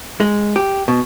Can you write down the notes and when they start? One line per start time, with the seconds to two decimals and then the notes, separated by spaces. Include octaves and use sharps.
0.20 G#3
0.56 G4
0.88 B2